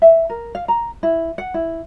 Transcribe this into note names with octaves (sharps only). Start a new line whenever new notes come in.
E5
A#4
F5
A#5
E4
F#5
E4